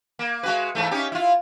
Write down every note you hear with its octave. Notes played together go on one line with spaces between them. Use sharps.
A#3
G#3 F#4 B4
G#2 E3 A3
C#4 D#4 G4
E4 F4